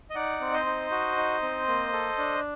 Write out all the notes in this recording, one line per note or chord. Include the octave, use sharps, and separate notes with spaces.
D#5
D#4 D5 F#5
C4
C5 D#5
D#4
F#4
D#4
C4
A#3
A4
D4